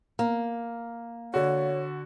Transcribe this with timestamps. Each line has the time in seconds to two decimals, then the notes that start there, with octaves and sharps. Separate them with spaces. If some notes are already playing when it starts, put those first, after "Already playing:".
0.19 A#3
1.34 D3 F#4 C#5